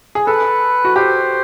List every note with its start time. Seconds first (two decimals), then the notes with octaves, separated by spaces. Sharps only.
0.15 G#4
0.27 A4 B4
0.85 F#4
0.96 G4 C5